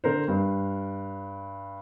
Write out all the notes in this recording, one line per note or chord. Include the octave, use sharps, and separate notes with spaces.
D3 A#4 C5
G2